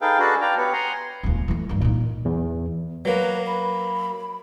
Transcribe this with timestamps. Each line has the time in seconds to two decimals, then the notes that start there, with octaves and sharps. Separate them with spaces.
0.01 D#4 G#4 A4 B4 F5 G5
0.19 D4 F#4 G#4 A4 B4
0.41 B4 D5 F5 G5 A#5
0.57 B3 G4 B4 C#5
0.73 F#5 G#5 A#5 C6
1.23 D#1 C#2
1.48 E3 A3
1.69 G2 D#3
1.81 A#2 D#4
2.25 E2
3.05 F#3 A#3 B4
3.47 B5